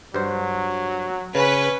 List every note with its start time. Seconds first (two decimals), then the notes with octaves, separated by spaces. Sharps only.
0.14 G2 F#3 C5
1.35 C#3 C#4 B4